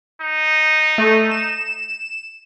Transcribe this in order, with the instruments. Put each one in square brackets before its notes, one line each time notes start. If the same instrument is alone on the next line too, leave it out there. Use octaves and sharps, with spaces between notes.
[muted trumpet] D#4
[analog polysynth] A3
E7